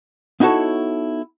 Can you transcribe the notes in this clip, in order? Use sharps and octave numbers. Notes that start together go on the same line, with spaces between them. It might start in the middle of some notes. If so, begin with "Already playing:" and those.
B3 D#4 E4 F#4 A4 C#5